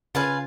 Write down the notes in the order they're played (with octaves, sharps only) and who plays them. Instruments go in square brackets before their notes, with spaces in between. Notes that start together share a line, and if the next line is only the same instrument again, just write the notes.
[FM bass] C#3 [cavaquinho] F4 B4 F5 G#5